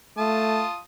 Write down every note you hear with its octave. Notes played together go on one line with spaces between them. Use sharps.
A3 F4 A5 D#6